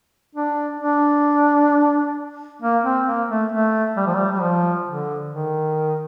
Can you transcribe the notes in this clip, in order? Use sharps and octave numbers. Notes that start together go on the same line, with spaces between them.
D4
D4
A#3
C4
A#3
A3
A3
G3
F3
G3
G3
F3
D3
D#3